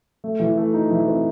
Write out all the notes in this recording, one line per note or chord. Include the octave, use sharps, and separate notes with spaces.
A3
E3
A3
D#4
E3
C4